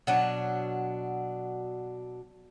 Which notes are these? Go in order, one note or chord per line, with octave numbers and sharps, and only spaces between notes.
B2 F#3 D4